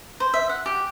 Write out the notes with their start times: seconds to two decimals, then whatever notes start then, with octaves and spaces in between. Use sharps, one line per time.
0.20 C5
0.34 E5
0.49 F#5
0.66 G4